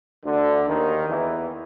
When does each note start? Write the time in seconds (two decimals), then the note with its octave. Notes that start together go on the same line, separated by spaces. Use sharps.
0.25 D2 D3
0.67 D#2 D#3
1.09 E2 E3